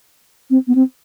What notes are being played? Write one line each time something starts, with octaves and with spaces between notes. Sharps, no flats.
C4
B3
C4